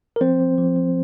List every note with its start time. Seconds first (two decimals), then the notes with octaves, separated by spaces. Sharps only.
0.16 A#4
0.21 F3 C4 C5
0.40 F3
0.58 F3
0.76 F3